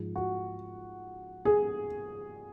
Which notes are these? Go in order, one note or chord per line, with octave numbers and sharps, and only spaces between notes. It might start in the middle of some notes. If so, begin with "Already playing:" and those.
Already playing: G#2 F3
F#4
G#4